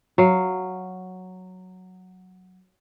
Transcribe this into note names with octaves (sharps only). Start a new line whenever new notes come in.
F#3 F5